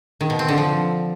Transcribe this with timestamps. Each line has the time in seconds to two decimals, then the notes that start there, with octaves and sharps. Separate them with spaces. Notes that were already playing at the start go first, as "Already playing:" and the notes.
0.21 D#3
0.30 B2
0.39 C4
0.48 D3
0.58 F3